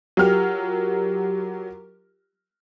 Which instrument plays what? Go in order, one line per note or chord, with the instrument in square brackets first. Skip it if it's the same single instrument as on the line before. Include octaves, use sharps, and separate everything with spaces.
[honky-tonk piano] F#3 F6 [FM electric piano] F4 G4 A#4